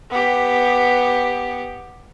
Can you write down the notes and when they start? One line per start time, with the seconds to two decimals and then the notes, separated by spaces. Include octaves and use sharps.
0.10 B3 G4